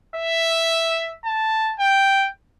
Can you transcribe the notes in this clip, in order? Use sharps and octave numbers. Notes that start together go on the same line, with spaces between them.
E5
A5
G5